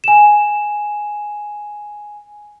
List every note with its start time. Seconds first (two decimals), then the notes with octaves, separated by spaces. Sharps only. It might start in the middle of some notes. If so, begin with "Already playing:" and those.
0.04 G#5 E7